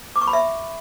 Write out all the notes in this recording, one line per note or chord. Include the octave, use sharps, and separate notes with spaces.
D6
C#6
B5
E5